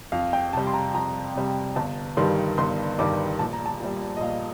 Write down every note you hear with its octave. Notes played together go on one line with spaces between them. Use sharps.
F2 F5
G5
C3 G3 A5
C6
A#5
F2 A#5
C3 G3
G1 A5
G2 D#3 G3 C6
G1 C6
G2 D#3 G3 D6
A#1 A5
A#5
A5
A#2 G3
D#5
A#1 F5